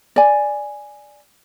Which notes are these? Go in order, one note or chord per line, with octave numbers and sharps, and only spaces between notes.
D5 G#5